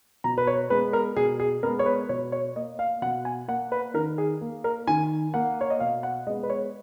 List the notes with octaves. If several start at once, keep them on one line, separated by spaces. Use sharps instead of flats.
B2 A#5
B4
C#5
G#3 B3 B4
A#4
B2 G#4
G#4
G#3 B3 A#4
C#5
B4
B2 C#5
C#5
A#3 D#5
F5
B2 F#5
G#5
A#3 F#5
B4
D#3 A#4
G#4
A#3
A#4
D#3 G#5
A#3 F#5
C#5
D#5
B2 F5
F#5
G#3 B3 D#5
B4
C#5